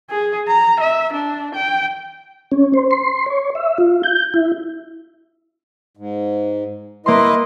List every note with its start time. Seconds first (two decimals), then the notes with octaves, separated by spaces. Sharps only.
0.10 G#4
0.48 A#5
0.81 E5
1.13 D4
1.55 G5
2.52 C#4
2.74 C5
2.91 C6
3.26 C#5
3.55 E5
3.78 F4
4.03 G6
4.34 E4
5.97 G#2
7.06 A#3 E4 B4 D#5 C6